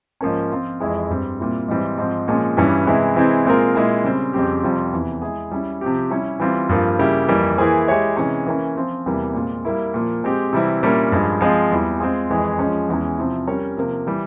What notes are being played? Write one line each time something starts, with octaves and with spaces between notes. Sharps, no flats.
G#2 F3 A#3 C#4
F3 C4 F4
F2 E3 G#3 E4 G#4
G2 G3 C4
A#2 G3 C4 E4
G#2 E3 G3 C4
G#2 F3 C4
A#2 F3 G#3 C#4
G2 E3 G3 C#4 E4
C3 E3 G#3 E4
C3 E3 G#3 C4 E4
A#2 G#3 C4 F4 A#4
A#2 G#3 E4 G#4
C#3 G3 C4
F2 C#3 G3 C4 G4
F2 C3 G3 C4 F4
E2 C3 E3
G#3 E4 G#4
G3 C#4 E4
C3 F3 C4 G4
G3 C#4 E4
E3 G3 C4 F4
G2 F3 A#3 F4
C#3 G3 A#3 E4 G4
F2 E3 G3 A#3
E3 A#3 E4 G#4 C5
G#3 E4 G4 C#5 E5
C3 E3 G#3 C#4
E3 A#3 C#4
F3 C4 F4
E2 C3 E3 G3 A#3
A#2 G#3 C4 F4
G3 A#3 E4
A#2 F3 A#3
G#3 C4 G4
C3 E3 G3 C4 E4
A#2 G3 C#4 E4 A#4
G2 F3 G#3
F3 G#3 C4 F4
E2 E3 G3
G#3 C4 F4 G#4
F2 E3 G#3 E4 G#4
F3 G#3 C#4
E2 E3 G#3 C#4
C3 F3 C4 E4
G3 C#4 G4 A#4 C#5
C3 F3 A#3
E3 G3